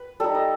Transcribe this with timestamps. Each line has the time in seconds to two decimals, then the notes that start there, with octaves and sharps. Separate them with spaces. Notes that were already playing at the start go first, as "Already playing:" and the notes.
Already playing: B4
0.20 G3 D#4 A4
0.35 D#5